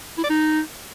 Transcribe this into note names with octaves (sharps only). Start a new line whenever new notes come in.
E4
D5
D#4